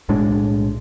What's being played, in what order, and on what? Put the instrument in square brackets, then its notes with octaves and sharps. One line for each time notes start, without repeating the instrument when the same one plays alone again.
[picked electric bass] B1 A2 G#3 D4